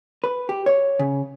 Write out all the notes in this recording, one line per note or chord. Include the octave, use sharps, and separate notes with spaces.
B4
G4
C#5
C#3